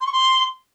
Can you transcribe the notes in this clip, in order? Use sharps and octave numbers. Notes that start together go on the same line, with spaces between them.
C6
C#6
C6